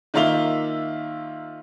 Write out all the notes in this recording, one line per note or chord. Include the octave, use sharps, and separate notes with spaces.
D#3 A#3 F4 E5 F7 G7